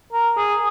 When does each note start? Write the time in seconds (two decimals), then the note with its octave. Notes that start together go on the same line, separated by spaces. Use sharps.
0.13 A#4
0.37 G#4